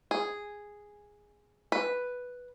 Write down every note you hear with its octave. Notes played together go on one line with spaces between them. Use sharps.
G#4
B4